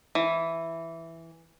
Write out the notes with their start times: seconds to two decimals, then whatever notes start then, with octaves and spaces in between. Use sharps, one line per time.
0.15 E3